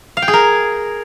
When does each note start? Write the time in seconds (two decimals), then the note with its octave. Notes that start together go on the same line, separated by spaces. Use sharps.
0.17 F5
0.22 G5
0.28 G#4
0.33 A#4